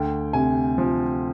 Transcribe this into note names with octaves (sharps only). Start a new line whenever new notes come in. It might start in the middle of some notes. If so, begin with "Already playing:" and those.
Already playing: D2 G5
C3 G#5
F3